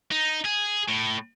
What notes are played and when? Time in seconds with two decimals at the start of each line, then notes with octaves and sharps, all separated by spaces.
0.11 D#4
0.45 G#4
0.89 A2